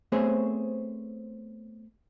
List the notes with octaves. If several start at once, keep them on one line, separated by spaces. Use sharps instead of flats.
A3 B3 C4 G#4 C5 C#5